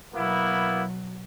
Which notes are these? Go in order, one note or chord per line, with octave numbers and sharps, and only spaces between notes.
B2 F#3 A#3 B3 E4